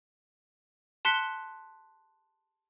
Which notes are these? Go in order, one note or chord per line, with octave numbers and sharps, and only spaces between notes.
A5 C6 F#6 B6 C#7 G7